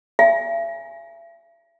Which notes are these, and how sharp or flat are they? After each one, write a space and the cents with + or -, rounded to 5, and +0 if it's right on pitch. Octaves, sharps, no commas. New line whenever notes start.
E5 +40 G#5 +0